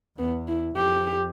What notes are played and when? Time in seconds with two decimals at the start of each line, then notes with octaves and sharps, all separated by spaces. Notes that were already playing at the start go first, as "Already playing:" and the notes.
0.18 E2 B3
0.48 E4
0.77 F2 G4